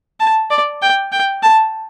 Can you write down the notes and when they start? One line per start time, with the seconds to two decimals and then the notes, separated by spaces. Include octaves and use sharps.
0.20 A5
0.51 D5
0.82 G5
1.12 G5
1.43 A5